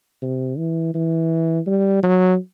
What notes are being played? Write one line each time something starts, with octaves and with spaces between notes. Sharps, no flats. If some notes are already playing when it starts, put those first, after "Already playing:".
C3
E3
E3
G3
F#3